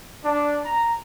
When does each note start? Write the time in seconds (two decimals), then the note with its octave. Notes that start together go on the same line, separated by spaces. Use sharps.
0.24 D4
0.65 A#5